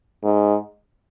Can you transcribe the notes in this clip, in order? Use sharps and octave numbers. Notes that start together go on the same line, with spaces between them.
G#2